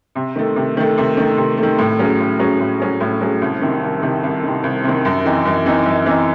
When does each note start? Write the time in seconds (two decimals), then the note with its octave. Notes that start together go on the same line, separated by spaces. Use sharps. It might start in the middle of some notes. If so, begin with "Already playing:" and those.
0.15 C3
0.36 D#3 A3
0.56 C3
0.77 D#3 A3
0.98 C3
1.17 D#3 A3
1.37 C3
1.57 A3
1.63 D#3
1.78 A2
1.99 F#3 C#4 G#4
2.20 A2
2.39 F#3 C#4 G#4
2.60 A2
2.80 F#3 C#4 G#4
3.00 A2
3.21 F#3 C#4 G#4
3.41 C2
3.61 C3 D#3
3.83 C2
4.02 C3 D#3
4.23 C2
4.43 C3 D#3
4.63 C2
4.84 C3 D#3
5.05 F#2
5.25 E3 C4 D#4
5.45 F#2
5.66 E3 C4 D#4
5.85 F#2
6.06 E3 C4 D#4